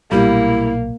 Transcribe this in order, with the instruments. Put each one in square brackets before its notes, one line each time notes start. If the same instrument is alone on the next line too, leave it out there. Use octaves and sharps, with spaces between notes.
[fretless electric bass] B1 A#2 B3 [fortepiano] G3 [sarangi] A#3 [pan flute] E4